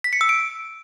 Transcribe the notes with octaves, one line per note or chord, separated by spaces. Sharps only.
B6
C#7
E6
D7